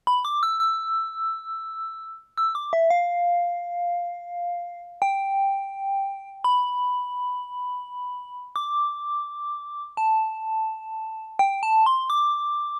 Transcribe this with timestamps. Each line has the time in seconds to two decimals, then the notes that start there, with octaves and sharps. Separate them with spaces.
0.07 B5
0.25 D6
0.43 E6
0.60 E6
2.38 E6
2.55 D6
2.73 E5
2.90 F5
5.02 G5
6.44 B5
8.56 D6
9.97 A5
11.39 G5
11.63 A5
11.86 C6
12.10 D6